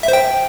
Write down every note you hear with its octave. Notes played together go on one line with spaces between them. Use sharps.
E5
C5
G5